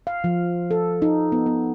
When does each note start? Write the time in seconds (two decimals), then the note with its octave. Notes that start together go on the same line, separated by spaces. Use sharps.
0.07 F5
0.24 F3
0.71 A4
1.02 D#4
1.32 B3
1.46 B3